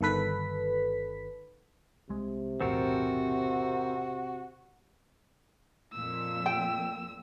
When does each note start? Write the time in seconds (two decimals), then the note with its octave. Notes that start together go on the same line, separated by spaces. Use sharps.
0.01 G1 D#3 A4 B4 B6
2.09 C2 C3 G#3
2.61 B1 E2 A2 C4 F#4 A4 A#4
5.93 F2 A#2 E6
6.46 G5